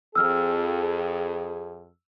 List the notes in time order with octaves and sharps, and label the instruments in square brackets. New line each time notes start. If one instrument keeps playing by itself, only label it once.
[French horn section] F2 G#4 [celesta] E6 F6